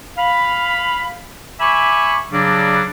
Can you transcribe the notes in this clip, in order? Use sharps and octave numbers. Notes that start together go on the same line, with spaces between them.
F5 B5
E5 G#5 B5 C#6 D6
C#3 F#3 G3 D4